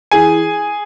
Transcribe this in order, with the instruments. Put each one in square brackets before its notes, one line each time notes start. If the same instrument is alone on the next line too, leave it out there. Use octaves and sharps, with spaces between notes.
[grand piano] E3 G#4 G#5